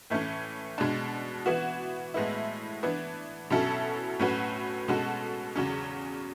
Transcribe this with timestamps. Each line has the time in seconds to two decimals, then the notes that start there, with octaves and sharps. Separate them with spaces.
0.10 A2 E3 A3 C#4
0.78 B2 G#3 D4
1.46 E3 B3 F#4
2.14 A2 G#3 B3 E4
2.83 E3 B3 D4
3.50 B2 F#3 C#4 E4 A4
4.19 A2 F#3 C#4 F#4 B4
4.88 B2 G#3 C#4 F#4 A4
5.56 E2 C#3 F#3 C#4